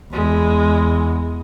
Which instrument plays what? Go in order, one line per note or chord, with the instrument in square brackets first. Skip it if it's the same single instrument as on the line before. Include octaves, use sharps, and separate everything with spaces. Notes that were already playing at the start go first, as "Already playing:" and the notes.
[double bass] E2 [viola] G#3